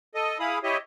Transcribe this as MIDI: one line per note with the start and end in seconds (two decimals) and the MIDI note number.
0.15 0.38 69
0.15 0.38 75
0.40 0.59 64
0.40 0.59 68
0.40 0.59 77
0.40 0.59 83
0.40 0.59 87
0.63 0.77 64
0.63 0.77 67
0.63 0.77 73
0.63 0.77 75
0.63 0.77 76